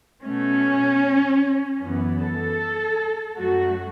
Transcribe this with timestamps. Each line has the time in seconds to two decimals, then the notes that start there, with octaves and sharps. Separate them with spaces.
0.24 B2 A3 C#4
1.81 F#2 E3 B3
2.20 A4
3.36 F#2 F#3 A3 F#4